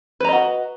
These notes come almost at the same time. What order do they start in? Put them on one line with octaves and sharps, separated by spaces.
B4 A#5 D#5 F#4